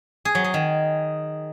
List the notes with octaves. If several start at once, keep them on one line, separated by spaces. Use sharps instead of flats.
G#4
F#3
G#4
D#3